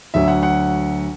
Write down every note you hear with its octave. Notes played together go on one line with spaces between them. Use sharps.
D2 D3 F#3 E5
F#5
F#5